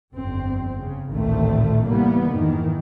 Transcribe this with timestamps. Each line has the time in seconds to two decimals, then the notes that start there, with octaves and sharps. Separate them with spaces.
0.14 G1 F2 C4
0.79 C#3
1.11 A1 D2 A#2 D#3 A3 C4
1.88 C3 E3 G3 A#3 B3
2.29 F2 G#2 D#3 E3